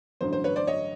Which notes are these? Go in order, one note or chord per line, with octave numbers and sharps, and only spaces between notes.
A1 G2 D3 F#3 C5
C5
B4 C#5
C5 D5
C#5 D#5